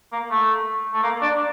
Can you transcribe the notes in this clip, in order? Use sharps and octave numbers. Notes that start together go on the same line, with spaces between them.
A#3
A3
A3
A#3
D4